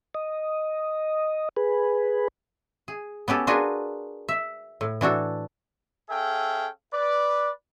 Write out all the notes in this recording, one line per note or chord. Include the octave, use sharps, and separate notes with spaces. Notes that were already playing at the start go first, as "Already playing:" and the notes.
D#5
G#4 B4
G#4
B3 C#4 G4 A4
D4 F4 F#4 G#4 A#4 B4
E5
A2
E3 D4 F#4 A4
C#4 G#4 A4 E5 F5 G5
B4 D5